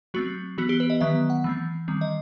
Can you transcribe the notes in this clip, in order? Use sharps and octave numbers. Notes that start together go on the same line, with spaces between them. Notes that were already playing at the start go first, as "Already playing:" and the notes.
F#3 A3 C4 F#4
E3 B3 F#4
G4
B4
D#5
D#3 F#3 B3 E5
F#5
E3 A3 C4
D#3 G3 C4
D#5